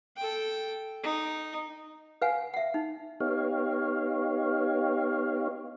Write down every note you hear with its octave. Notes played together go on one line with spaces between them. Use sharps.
A4 G5
D#4
B4 F5 F#5 G#5
E5 F#5
D#4
B3 D#4 G4 C#5 F5